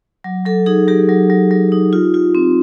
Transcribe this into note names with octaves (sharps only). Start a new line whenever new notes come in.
F#3
F#3 A4
D#4 G#4
F#3 G4
F#3
F#3
F#3
D#4
F4
F4
C4